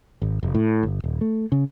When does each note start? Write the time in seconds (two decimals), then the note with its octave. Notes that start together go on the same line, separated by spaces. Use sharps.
0.22 G#1
0.43 F1
0.55 A2
0.83 G1
1.04 D#1
1.21 A3
1.52 C#3